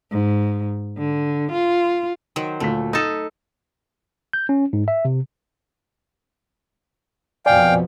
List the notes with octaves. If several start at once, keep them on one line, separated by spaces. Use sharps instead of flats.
G#2
D3
F4
D#3 F#3 C5
D2 A#2 A3 B6
D#4 A4 D#6
G6
C#4
G#2
E5
C3
F2 B2 F3 D5 F5 G5 G#5